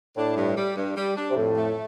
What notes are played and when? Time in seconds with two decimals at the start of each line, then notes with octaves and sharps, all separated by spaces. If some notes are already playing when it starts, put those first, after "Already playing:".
0.17 A2 D4
0.37 G2
0.57 G3
0.77 G2
0.96 G3
1.16 D4
1.30 C3
1.36 F2 A2
1.57 A3